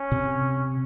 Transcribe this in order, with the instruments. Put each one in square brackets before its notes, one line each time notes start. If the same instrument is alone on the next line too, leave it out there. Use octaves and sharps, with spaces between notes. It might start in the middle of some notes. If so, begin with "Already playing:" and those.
Already playing: [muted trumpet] C#4
[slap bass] C3